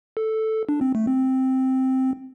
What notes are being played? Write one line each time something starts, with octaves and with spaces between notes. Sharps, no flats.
A4
D4
C4
A3
C4